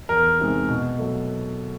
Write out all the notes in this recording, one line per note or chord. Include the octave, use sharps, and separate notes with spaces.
E2 A#4
C3 D#3 G#3
B2
F#3 A3